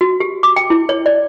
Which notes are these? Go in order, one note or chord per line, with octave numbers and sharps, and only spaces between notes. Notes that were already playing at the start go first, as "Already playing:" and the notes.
F#4
G4
D6
G5
E4
C#5
D5